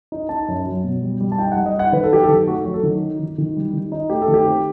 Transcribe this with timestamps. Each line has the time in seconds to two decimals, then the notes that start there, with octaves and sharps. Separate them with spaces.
0.12 D#4
0.29 D#4 A5
0.48 F#2
0.66 F#3
0.84 B2
1.02 G3
1.20 G3
1.32 A5
1.38 D#4 G5
1.52 F#5
1.56 G3
1.66 D#5
1.74 D#4 F#5
1.92 D#3 B4
2.04 A4
2.11 F#3 G4
2.23 A4
2.29 D#3
2.48 A3 F#4
2.65 F#3
2.74 A4
2.83 D#3
3.02 D#4
3.19 D#3
3.38 D#3
3.56 G3
3.73 D#3
3.92 D#4
4.10 A3 G4
4.22 A4
4.28 D#3
4.34 G4
4.46 C4